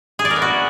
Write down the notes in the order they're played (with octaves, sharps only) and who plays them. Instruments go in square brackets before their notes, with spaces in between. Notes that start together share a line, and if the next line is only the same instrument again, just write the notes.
[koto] G#4
D5
A#4
B3
F#4